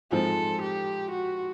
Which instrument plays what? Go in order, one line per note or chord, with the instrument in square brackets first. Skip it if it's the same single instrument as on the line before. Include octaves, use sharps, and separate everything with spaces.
[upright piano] G#2 F3 G#3 C4 [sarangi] A4
[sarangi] G4
F#4